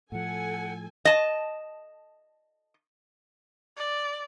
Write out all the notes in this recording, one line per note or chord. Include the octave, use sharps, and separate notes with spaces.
A2 F3 A4 F#5 G#5
D#5 A5
D5